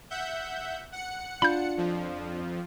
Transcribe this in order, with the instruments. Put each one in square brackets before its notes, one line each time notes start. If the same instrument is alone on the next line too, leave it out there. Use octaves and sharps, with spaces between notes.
[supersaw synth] E5 F#5 G6
F#5 C#7
[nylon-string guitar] D4 F4 [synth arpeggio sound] B5 G6
[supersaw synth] F2 F3